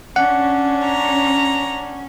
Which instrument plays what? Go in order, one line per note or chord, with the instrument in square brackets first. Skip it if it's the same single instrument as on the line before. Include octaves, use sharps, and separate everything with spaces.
[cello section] C#4 [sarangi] D4 [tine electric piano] F#5
[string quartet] A#5